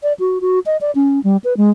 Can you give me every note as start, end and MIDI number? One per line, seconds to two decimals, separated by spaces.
0.03 0.13 74
0.19 0.38 66
0.41 0.59 66
0.66 0.77 75
0.81 0.91 74
0.95 1.22 61
1.24 1.37 55
1.44 1.56 71
1.57 1.71 56